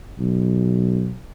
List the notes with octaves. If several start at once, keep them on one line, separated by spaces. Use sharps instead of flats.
B1